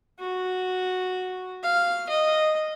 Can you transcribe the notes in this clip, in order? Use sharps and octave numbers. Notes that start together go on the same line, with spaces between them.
F#4
F5
D#5